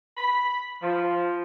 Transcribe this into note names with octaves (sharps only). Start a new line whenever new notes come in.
B5
F3